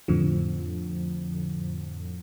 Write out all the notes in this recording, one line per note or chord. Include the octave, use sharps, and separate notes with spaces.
F2 A2 D3 F3